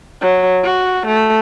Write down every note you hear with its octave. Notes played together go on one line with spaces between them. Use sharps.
F#3
F#4
A3